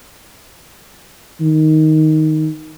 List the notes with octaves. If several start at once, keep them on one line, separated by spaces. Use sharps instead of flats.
D#3